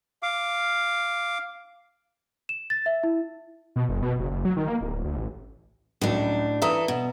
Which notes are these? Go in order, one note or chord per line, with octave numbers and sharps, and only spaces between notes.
F5 D6
E7
A6
E5
E4
B2
F#1
B2
F#1
F#1
F#3
D#3
A#3
D1
D2
A1
C#2 A2 F#3 D4
E3 A4 E5 A#5 D#6
B2